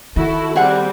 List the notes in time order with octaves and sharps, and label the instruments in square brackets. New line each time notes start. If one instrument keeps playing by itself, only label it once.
[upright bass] D#3 [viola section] E4 F#4 A4
[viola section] G3 C4 [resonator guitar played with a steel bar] G#4 F#5